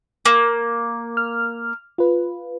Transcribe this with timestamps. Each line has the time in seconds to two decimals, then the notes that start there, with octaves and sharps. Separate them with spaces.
0.25 A#3
1.17 F6
1.98 F4 B4